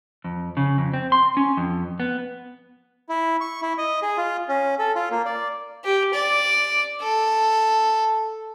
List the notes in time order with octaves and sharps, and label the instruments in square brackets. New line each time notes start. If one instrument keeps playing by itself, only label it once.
[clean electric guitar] F2
C#3
F2
C4
C6
C#4
F2
B3
[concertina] E4
C#6
E4
D#5
G#4
F4
C#4
A4
F4
A#3
D5
[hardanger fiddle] G4
D5
A4